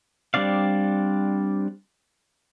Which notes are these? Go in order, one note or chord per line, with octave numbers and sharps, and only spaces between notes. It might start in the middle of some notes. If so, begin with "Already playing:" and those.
G3 C4 D4 D5 F5